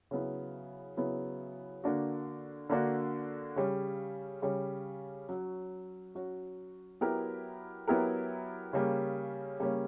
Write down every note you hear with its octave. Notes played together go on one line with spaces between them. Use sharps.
C#3 F#3 B3 E4
C#3 F#3 B3 E4
D3 A#3 D4 F#4
D3 A#3 D4 F#4
C#3 G3 C#4
C#3 G3 C#4
F#3 C#4 F#4
F#3 C#4 F#4
F#3 B3 E4 G4 A#4
F#3 B3 E4 G4 A#4
C#3 G3 A#3 C#4
C#3 G3 A#3 C#4